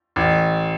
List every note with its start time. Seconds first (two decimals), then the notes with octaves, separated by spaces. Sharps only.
0.16 A1